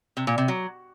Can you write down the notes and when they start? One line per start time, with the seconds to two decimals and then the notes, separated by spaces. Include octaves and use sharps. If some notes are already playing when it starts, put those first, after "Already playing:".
0.17 C3
0.27 A#2
0.38 C3
0.48 F#3